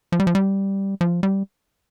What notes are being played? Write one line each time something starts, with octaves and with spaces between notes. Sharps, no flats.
F3
G3
F3
G3
F3
G3